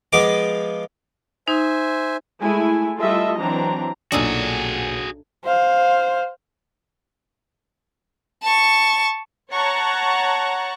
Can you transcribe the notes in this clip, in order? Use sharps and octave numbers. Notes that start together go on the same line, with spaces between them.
F3 G#3 B3 D#5 G#5 D6
D#4 C5 E5 G#5
G#3 A3 E4 G#5
G3 A3 F4 A4 D#5 E5
E3 F#3 C4 D4 A#5
B1 A#2 D4 D#4 F#4 G#4 A4 G#5
C5 F5
A5 C#6
C#5 F#5 A5 A#5 C#6 F#6